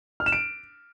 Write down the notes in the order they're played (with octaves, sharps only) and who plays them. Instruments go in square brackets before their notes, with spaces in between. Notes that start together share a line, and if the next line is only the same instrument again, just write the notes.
[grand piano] F6
E7
D7